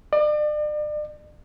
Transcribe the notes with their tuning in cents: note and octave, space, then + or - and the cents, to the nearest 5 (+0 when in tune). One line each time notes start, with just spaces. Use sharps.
D5 +40